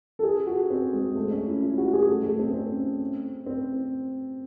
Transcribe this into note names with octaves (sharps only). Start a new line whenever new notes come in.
A4
G#4
F#4
C4
G#3
A3
C#4
E4
E4
F#4
G#4
A3
A3
C4
C#4
C4
C4